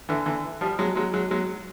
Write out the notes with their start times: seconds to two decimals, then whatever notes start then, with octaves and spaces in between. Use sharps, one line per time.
0.09 D3 E3
0.26 D3 E3
0.61 F3 G3
0.79 F#3 G#3
0.96 F#3 G#3
1.13 F#3 G#3
1.31 F#3 G#3